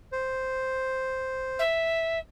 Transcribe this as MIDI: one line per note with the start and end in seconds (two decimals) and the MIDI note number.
0.12 1.62 72
1.59 2.19 76